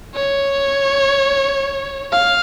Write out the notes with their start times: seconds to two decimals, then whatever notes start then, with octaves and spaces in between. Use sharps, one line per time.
0.15 C#5
2.12 F5